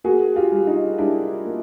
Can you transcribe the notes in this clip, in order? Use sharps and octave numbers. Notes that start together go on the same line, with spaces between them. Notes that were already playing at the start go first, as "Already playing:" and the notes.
A#3 F#4 G#4
F4 G4
G3
D#4 F4
G3 D4 E4
A#3